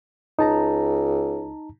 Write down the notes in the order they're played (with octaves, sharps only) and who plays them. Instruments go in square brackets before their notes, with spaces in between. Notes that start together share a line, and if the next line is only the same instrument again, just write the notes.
[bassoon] C#2 [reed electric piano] D#4 A5 A#5